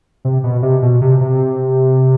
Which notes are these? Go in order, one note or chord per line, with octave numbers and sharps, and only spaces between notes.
C3
B2
C3
B2
C3
C3